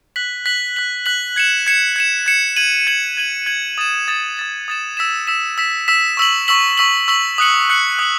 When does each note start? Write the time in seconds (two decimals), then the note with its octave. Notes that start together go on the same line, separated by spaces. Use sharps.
0.16 F#6 B6 F#7
0.46 F#6 B6 F#7
0.76 F#6 B6 F#7
1.06 F#6 B6 F#7
1.36 G#6 C#7 E7
1.67 G#6 C#7 E7
1.96 G#6 C#7 E7
2.26 G#6 C#7 E7
2.56 G#6 D#7 F#7
2.87 G#6 D#7 F#7
3.17 G#6 D#7 F#7
3.46 G#6 D#7 F#7
3.78 D#6 A6 E7
4.08 D#6 A6 E7
4.37 D#6 A6 E7
4.68 D#6 A6 E7
4.97 E6 B6 E7
5.27 E6 B6 E7
5.58 E6 B6 E7
5.88 E6 B6 E7
6.17 C#6 E6 B6 F#7
6.48 C#6 E6 B6 F#7
6.78 C#6 E6 B6 F#7
7.08 C#6 E6 B6 F#7
7.38 D#6 F#6 C#7 F#7
7.68 D#6 F#6 C#7 F#7
7.99 D#6 F#6 C#7 F#7